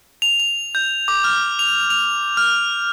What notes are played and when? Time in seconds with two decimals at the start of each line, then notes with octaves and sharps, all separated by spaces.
0.22 F7
0.40 F7
0.75 G6
1.08 D6
1.24 F6
1.59 F7
1.90 F7
2.37 F6